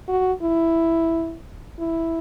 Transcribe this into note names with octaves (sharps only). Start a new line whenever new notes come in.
F#4
E4
E4